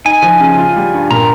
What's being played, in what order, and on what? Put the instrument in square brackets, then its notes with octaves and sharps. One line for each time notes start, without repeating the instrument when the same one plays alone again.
[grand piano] D#4 [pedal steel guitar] G#5
[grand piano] F3
C#3
F4
G3
G2
[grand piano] A#2 [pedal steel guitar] A#5